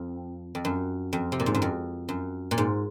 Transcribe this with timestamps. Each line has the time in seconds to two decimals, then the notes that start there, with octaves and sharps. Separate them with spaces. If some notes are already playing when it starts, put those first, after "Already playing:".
Already playing: F2
0.55 F2
0.65 F#2
1.13 F2
1.32 C3
1.40 A#2
1.46 G#2
1.55 F#2
1.62 F2
2.09 F#2
2.51 A#2
2.58 G#2